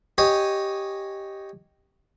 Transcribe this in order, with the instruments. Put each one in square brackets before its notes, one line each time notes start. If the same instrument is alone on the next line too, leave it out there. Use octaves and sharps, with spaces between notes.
[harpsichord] G4 C#5 D#5 G#5